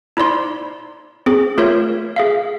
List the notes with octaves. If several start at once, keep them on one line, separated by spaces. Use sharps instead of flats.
D#4 E4 C5 D5 C6
C4 G#4
A3 F4 A#4 C#5 E5 G6
G#4 E5 F5